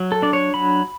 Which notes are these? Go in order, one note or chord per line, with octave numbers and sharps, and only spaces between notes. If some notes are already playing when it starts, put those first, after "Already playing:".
Already playing: F#3
A4
D4 D5
C#5
F#3 B5